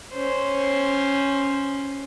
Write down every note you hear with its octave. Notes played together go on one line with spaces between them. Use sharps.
C#4 C5